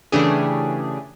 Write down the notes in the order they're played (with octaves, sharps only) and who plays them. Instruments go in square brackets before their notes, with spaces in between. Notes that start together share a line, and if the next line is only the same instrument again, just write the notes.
[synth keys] C#3 E3 A3 D4 G4 G#4